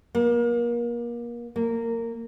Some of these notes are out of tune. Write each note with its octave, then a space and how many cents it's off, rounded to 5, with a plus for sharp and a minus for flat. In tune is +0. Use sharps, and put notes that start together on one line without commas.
A#3 +30
A#3 -20